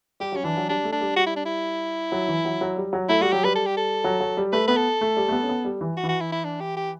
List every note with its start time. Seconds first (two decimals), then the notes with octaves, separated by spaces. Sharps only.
0.20 G3 G4
0.32 F#3 C#4
0.44 E3 D4
0.57 F#3
0.68 G3 D4
0.84 A3
0.93 D4
1.01 G3
1.16 G3 F#4
1.26 E4
1.36 D4
1.46 E4
2.12 F#3
2.28 E3
2.45 F#3
2.61 F#3
2.77 G3
2.93 F#3
3.09 A3 E4
3.21 G3 F#4
3.33 F#3 G4
3.44 G3 B4
3.56 A4
3.66 G4
3.77 A4
4.04 F#3
4.20 F#3
4.37 G3
4.53 A3 B4
4.67 B3 B4
4.76 A4
5.01 A3
5.17 G3
5.28 A3
5.32 B3
5.43 C#4
5.49 B3
5.65 G3
5.81 E3
5.97 F#4
6.03 E3
6.09 F#4
6.21 E4
6.32 E4
6.45 D4
6.61 G4
6.77 G4